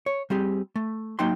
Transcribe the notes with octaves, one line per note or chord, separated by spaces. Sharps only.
C#5
G3 C4 G4 G#4
A3
F#3 A#3 D#4 G5 C6